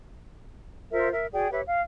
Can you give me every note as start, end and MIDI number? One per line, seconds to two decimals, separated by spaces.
0.92 1.11 65
0.92 1.11 70
0.92 1.11 72
0.92 1.11 76
1.13 1.26 70
1.13 1.26 76
1.33 1.50 66
1.33 1.50 68
1.33 1.50 74
1.33 1.50 79
1.51 1.61 67
1.51 1.61 71
1.51 1.61 73
1.51 1.61 76
1.66 1.80 77